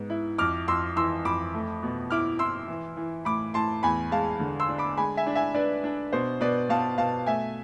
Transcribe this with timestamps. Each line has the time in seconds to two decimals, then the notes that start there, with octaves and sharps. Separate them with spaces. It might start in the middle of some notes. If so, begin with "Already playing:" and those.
Already playing: G#2 B3
0.10 E4
0.38 F2 D6 F6
0.68 F2 C6 E6
0.96 E3 C6 E6
1.25 F2 B5 D6
1.54 A3
1.83 B2
2.10 E4 D6 F6
2.39 E4 C6 E6
2.68 E3
2.97 E3
3.25 A2 B5 D6
3.54 A2 A5 C6
3.83 E2 G#5 B5
4.11 G#3 F5 A5
4.40 D3
4.60 C6 E6
4.68 D4
4.78 B5 D6
4.97 G#3 G#5 B5
5.17 E5 G#5
5.27 D4
5.35 E5 G#5
5.54 D4 B4 D5
5.84 D4
6.13 B2 C5
6.40 B2 B4 D5
6.69 B2 F5 A5
6.98 B2 F5 A5
7.26 A3 E5 G#5